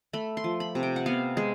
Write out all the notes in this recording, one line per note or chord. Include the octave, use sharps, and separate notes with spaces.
A3 B5
C6
F3
B5
C3
G5
F#5
B3 F5
G#3